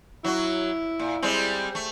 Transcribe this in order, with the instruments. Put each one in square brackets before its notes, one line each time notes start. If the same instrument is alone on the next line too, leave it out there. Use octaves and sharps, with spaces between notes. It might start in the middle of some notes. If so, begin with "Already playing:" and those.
[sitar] F#3 F#4 [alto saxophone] E4
[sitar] A#2
G3 G#3 C4
A3